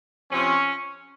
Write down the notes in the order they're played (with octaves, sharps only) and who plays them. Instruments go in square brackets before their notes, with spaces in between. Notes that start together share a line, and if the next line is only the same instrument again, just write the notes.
[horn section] C3 F3 C4 C#4